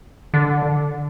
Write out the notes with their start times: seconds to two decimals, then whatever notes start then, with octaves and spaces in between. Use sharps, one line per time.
0.34 D3